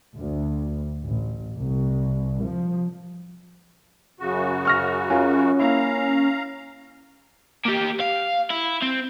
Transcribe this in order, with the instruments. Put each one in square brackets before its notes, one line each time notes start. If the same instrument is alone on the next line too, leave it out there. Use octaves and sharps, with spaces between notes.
[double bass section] D2
A1
C2
F3
[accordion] F#2 C#3 F#4
[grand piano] C#6 F6 A#6
[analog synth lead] C#4 [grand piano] F4 A#4
[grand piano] A#3 E4 [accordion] F5 A#5
[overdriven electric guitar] A#3 G4
F5
E4
C4